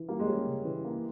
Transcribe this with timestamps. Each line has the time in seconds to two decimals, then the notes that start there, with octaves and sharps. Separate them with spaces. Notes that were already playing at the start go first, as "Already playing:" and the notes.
Already playing: E3
0.09 G3 A#3
0.19 G#3
0.27 G3 C#4
0.47 C#3
0.65 E3
0.84 A#3